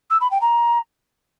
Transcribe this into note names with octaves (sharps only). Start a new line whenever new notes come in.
E6
B5
G5
A#5